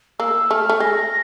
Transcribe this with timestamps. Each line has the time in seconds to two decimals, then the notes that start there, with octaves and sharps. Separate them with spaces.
0.20 A#3 E6
0.50 A3 F6
0.69 A3
0.80 G#3 A#6